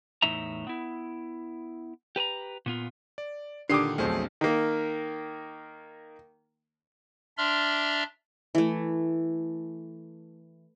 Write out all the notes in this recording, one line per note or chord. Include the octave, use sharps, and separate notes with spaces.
E2 A2 D#4 E5 A#5
B3 E4
G4 B4 A5 A#5
A#2 B3 F4
D5
A#2 D3 D#3 D4 G4 D6 D#6 C7
B1 F2 A3 G#4 C5
D#3 A#3
D4 D5 E5 A#5 C6 F6
E3 A3